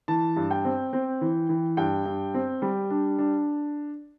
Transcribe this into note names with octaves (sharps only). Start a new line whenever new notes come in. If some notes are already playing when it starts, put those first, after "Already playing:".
E3 A5
G2
G5
C4
C4
E3
E3
G2 G5
G2
C4
G3
D4
D4